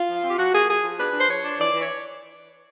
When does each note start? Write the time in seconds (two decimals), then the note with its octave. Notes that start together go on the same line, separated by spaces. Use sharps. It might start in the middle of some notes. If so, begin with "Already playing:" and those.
Already playing: F4
0.08 F3
0.23 C4
0.28 G4
0.37 F3 F#4
0.52 A#3 G#4
0.68 F3 G#4
0.83 F3
0.98 D4 B4
1.13 D4 C5
1.29 F3 C#5
1.43 D4
1.58 E3 D5
1.74 E3 C#5